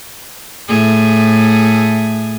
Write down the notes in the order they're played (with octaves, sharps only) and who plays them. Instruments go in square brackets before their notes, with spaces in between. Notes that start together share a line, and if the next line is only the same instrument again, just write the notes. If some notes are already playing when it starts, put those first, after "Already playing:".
[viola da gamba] A2 A3 G#4